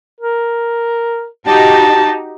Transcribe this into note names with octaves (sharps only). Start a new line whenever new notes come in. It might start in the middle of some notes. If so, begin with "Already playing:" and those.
A#4
D#4 F#4 G4 A5